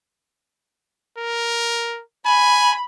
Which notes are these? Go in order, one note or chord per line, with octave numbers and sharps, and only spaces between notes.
A#4
G#5 B5